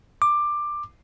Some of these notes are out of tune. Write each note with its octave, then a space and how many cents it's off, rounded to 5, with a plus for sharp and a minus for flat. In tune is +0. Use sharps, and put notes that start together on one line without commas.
D6 +15